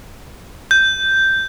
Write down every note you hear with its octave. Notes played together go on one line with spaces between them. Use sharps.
G6